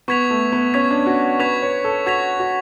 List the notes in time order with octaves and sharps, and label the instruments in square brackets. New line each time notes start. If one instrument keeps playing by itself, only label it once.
[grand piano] B3 [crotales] C#6 G#6 B6 F7
[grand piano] A3
B3
[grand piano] C#4 [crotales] C#6 G#6 B6 F7
[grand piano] D4
F#4
[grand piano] B4 [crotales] C#6 G#6 B6 F7
[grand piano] C#5
A4
[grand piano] F#4 [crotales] C#6 G#6 B6 F7
[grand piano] F#4